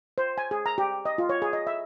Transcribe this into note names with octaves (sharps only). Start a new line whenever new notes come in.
C5
G#5
G#4
A#5
G4
D#5
F4
C#5
G#4
D#5
E5